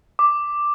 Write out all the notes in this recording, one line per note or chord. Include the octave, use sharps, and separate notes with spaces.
D6